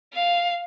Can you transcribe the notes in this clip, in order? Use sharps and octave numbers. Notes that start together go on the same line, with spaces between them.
F5